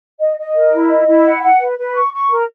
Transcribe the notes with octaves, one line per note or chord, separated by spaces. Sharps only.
D#5
D#5
A#4
E4
D#5
E4
F#5
F#5
B4
B4
C#6
C#6
A#4